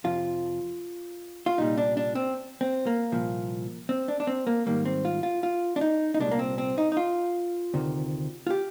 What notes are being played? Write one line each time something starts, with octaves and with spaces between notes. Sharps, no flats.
F2 C3 F3 F4
F4
C2 A#2 G3 D#4
D4
D4
C4
C4
A#3
C2 A#2 F3
C4
D4
D4
C4
A#3
G#2 D#3 G3 A#3
C4
F4
F4
F4
D4
D#4
D#4
C2 A#2 G#3 D4
A#3
C4
C4
D#4
D#4
F4
D2 C3 D#3
F4
G4